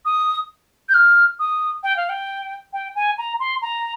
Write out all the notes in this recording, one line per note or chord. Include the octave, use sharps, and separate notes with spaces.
D#6
G6
F6
D#6
G5
F5
G5
G5
G#5
A#5
C6
A#5